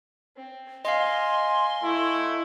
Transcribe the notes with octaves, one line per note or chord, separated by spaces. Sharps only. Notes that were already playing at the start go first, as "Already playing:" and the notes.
C4
D#5 F5 G#5 C6
A3 E4